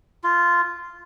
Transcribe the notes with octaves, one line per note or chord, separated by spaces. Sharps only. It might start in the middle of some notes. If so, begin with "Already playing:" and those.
F4